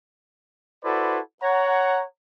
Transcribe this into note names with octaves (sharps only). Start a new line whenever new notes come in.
E4 F#4 A4 B4 C5 D5
C#5 F#5 A#5